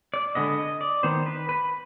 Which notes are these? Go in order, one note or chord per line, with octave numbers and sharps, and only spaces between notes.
D5
D3 G#3 B3 D#5
D#5
D5
D#3 B3 C5
B4
B4